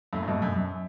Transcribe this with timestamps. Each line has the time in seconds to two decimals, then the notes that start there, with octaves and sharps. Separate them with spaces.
0.13 F#2 A2
0.23 A2
0.27 G2 B2
0.42 F#2
0.55 F#2